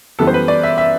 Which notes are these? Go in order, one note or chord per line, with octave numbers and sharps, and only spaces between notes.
F#2 E3 G3 B3 A4
C5
B4
D5
E5
E5